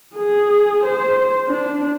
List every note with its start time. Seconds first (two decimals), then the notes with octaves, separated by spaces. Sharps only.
0.15 G#4
0.83 C5
1.48 D4